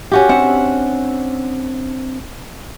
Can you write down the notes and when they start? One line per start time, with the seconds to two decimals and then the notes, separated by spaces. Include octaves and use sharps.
0.12 C#4 F#4 G4
0.29 C4 D4 E5 F#5